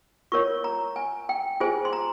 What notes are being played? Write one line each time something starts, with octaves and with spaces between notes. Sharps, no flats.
F4 A#4 C#5 C#6
A#5
G#5
G5
F4 G#4 C5 G#5
C6
A#5